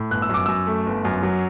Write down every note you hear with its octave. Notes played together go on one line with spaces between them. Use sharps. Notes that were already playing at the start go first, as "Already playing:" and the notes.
Already playing: A2
G1 F#6
E6
F#2 D6
F#2 E6
A3
G1
F#2
F#3